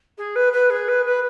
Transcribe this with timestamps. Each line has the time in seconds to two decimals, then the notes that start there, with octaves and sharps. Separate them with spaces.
0.18 G#4
0.35 B4
0.53 B4
0.70 G#4
0.88 B4
1.05 B4